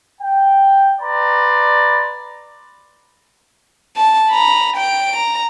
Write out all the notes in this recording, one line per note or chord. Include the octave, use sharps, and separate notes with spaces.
G5
B4 D5 A#5 C6
A5
A#5 B5
G5 D7
A#5